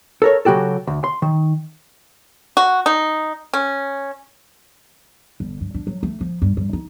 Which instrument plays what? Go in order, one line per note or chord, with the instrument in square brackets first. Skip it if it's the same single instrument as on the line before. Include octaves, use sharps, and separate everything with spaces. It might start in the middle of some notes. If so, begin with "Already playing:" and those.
[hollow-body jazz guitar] A4 A#4 C#5
C#3 F#3 F#4 G4 A4
D2
C6
D#3
[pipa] F#4
D#4
C#4
[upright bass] G1
G2
D4
F#3
A3
F3
G2
G2
D#4